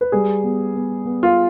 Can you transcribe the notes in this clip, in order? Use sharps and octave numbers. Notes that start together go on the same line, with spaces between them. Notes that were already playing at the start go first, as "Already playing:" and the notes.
B4
G3 G#4
B3
B3
B3
F4